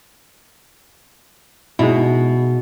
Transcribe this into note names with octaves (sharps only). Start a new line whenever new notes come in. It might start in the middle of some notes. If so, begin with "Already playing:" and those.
B2 G#3 D#4 E4